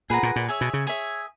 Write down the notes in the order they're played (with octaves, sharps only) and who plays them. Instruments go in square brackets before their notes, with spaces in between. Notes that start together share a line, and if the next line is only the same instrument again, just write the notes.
[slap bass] A#2 [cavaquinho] G#4 B4 F#5 A#5
[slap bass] A#2
A#2
[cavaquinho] G#4 C#5 E5
[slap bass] B2
C#3
[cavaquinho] G#4 C#5 E5